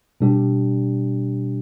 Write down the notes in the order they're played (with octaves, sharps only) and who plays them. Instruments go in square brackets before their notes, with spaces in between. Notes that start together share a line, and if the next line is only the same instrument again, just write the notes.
[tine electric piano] B2 G3 D4 G4